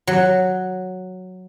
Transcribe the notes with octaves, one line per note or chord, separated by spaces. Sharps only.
F#3